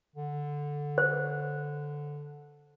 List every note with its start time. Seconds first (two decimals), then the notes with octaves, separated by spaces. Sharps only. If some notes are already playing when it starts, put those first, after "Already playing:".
0.16 D3
0.98 C5